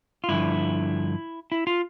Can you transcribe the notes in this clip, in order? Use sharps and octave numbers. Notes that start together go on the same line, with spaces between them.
F4
G2 D3 F3 E4
E4
F4